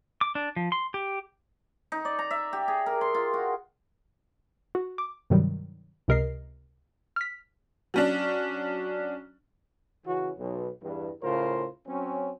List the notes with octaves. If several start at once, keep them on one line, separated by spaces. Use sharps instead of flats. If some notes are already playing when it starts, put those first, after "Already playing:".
D6
D4
F3
C6
G4
D#4
D5
A#5
E5
G4
G#4
A#4
C6
F4
F#4
F#4
D6
G2 C3 D#3 F#3 G3
C#2 C3 A#4 D#5 C7
F6 B6
F#3 C#4 D4
C#3 E3 C#4 F#4
B1
E2 G2
A2 C#3 F4 A#4 C5
F#3 C4 C#4